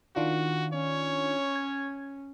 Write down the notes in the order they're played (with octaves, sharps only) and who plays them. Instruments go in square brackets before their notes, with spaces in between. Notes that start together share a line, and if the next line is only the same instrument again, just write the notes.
[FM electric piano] D#3 D4 F4 [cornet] F#4
[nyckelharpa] C#4 [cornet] C#5
[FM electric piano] G#6